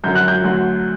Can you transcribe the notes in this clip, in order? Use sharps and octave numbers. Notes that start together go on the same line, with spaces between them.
F#2 D3 F#3 G6
F#6
G6
D2 D3 F#3